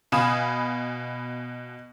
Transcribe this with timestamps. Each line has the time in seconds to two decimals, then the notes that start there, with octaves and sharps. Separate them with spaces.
0.12 B2 F5 G#5 B5 D#6 E7